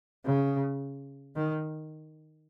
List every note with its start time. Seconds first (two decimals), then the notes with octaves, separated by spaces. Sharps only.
0.25 C#3
1.36 D#3